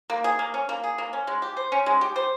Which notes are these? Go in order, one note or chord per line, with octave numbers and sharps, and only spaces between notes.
A#3
G#4
A#3
C#4
A#3
G#4
A#3
C#4
G#3
G4
C5
C#4
G#3
G4
C5